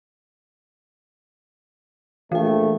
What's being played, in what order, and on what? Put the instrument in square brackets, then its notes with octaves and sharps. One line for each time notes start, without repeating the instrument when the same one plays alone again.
[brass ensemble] A#1 A3 [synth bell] E3 G5